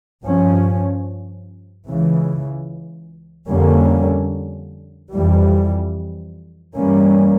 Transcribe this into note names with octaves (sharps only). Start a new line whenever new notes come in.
G2 F3 C#4
C#2 C#3 E3
F2 D3 G3 A#3 C#4
F2 E3 G3
G2 E3 G3 A#3 C#4